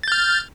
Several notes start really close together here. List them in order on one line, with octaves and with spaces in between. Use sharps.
A6 G6 F6